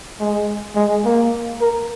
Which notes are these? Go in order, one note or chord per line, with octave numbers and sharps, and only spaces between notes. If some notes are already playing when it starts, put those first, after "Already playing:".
G#3
G#3
A#3
A#4